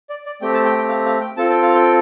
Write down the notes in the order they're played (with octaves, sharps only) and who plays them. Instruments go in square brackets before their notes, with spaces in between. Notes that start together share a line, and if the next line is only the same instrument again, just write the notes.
[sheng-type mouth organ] D5
D5
A3 C4 G4 G5
A5
G5
G5
F5
F5
G5
C4 F4 A4 A5
G5
F5
G5